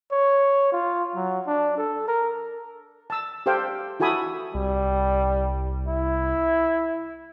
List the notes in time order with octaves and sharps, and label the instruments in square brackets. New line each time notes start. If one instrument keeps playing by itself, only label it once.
[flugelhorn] C#5
F4
F#3
D4
A4
A#4
[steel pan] A5 E6
G4 A4 C5 F5 G5
E4 F#4 A4 G#5 B5 D#6
[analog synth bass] C2 [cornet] G3
[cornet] E4